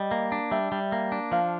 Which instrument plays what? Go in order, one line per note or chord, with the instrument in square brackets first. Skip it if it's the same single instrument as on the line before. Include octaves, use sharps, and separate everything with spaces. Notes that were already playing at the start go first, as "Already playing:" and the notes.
Already playing: [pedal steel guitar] G3 [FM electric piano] D#5
[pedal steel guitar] A#3
D4
[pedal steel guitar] G3 [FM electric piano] E5
[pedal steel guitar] G3
A#3
D4
[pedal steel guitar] F3 [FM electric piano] F5